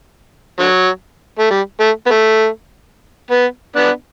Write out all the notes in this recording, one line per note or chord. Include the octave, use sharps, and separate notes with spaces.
D3 F#3
A3
G3
A3
B3
A3
B3
B3 D4